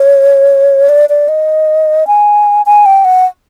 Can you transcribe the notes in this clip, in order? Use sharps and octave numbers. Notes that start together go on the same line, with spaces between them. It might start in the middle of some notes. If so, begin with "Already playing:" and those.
Already playing: C#5
D5
D5
D#5
G#5
G#5
G5
F#5